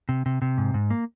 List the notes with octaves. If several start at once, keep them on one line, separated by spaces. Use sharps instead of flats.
C3
C3
C3
G#2
G#2
A#3